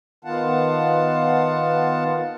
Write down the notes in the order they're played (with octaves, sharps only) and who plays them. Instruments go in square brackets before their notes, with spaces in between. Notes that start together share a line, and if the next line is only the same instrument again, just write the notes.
[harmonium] D#3 B3 F4 F5 F#5 A5